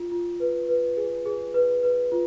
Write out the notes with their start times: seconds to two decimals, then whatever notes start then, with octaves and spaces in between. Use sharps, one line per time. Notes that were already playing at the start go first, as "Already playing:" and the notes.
Already playing: F4
0.12 F4
0.40 B4
0.69 B4
0.97 G#4
1.26 G#4
1.54 B4
1.83 B4
2.12 F4